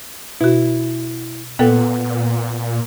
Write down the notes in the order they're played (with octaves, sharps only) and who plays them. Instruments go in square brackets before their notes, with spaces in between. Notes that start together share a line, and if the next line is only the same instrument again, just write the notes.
[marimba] B2 F#4 [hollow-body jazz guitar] E4
[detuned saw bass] A#2 [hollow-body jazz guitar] B3 [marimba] A4 G5